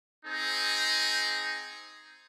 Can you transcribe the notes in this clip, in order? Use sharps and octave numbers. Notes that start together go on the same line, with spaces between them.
C4 D#4 G#4